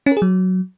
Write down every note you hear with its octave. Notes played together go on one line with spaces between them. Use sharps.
C#4
A#4
G#4
F#3